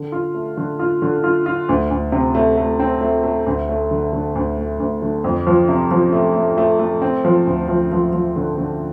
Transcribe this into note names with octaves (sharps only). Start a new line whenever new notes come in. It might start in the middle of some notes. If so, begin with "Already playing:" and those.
Already playing: D3
F4
A3
D3
F4
D3
F4
F4
D2
D2
C3
A3
A3
C4
A3
A3
D2
A3
D3
D3
D2
A3
D2
D3
F2
F3
C3
F3
A3
A3
A3
A3
C4
F3
D2
F3
F3
F3
D3
D3